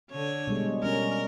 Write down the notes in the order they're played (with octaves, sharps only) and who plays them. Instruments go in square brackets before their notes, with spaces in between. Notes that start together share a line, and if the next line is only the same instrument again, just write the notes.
[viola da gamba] D3 C#5
[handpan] B2 G3 G#3
[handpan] G3 C#4 [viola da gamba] A#4